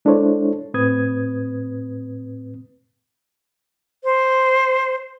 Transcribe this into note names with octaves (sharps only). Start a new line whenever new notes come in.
G#3 D4 E4 A4 C5 C#5
A2 C4 B4 D#6 G#6
C5